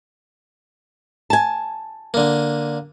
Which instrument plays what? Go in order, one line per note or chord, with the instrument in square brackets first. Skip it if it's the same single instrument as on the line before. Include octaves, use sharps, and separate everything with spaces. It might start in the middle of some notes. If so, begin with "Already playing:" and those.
[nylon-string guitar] G#5 A5
[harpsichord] D3 A#3